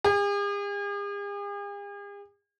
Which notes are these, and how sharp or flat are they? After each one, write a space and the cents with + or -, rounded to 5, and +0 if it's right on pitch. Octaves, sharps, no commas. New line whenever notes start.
G#4 -45